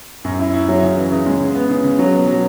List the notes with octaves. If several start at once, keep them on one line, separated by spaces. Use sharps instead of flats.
F#2
E4
E4
F#3
C#3
E3
C#3
G#3
C#3
B3
C#3
C#3
F#3
B2
F#3